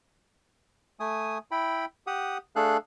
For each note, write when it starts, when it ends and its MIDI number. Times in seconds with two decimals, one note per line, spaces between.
1.00 1.38 57
1.00 1.38 80
1.00 1.38 87
1.51 1.85 64
1.51 1.85 79
1.51 1.85 83
2.07 2.38 67
2.07 2.38 78
2.07 2.38 87
2.56 2.77 57
2.56 2.77 62
2.56 2.77 68
2.56 2.77 69
2.56 2.77 77
2.56 2.77 90